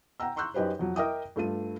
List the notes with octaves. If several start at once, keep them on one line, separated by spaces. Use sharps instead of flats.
F#5 G5 A#5 E6
A#5 C6 C#6 E6 F#6 G6
F#2 D#4 G4 B4 C5
F2 F#3
A#4 D#5 E5 G5 D6 D#6
G2 A3 F4 D#7